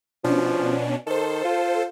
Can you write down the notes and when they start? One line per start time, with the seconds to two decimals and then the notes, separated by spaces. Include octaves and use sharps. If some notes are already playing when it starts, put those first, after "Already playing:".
0.24 B2 F3 C#4 D4
1.07 D#3 A4 C5
1.45 F4